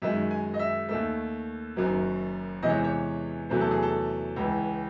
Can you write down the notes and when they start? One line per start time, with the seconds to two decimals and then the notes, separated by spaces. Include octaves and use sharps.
0.02 F#2 D#3 G#3 E5
0.31 G#5
0.54 D#5
0.59 E5
0.88 D#2 D#3 A3 E5
1.76 F#1 F#2 D#3 F#3
2.62 E2 C3 E3 G#3 D#5
2.70 C#5
2.77 C5
2.84 C#5
3.49 E2 C3 F#3 A3 C5
3.61 A4
3.71 G#4
3.82 A4
4.36 C#2 C#3 E3